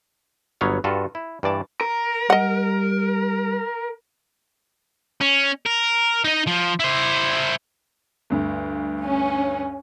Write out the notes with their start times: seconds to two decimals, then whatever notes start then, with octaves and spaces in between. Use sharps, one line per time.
0.61 G1 F#3 B3 C#5 F5
0.84 G2 F4 F#4 A4 B4
1.15 E4
1.43 G2 E3 D5 A5
1.81 A#4
2.30 G3 D#5 F#5
5.21 C#4
5.66 A#4
6.24 D#4 D#5
6.47 F3
6.80 E4 C5
8.30 D2 G2
9.03 C#4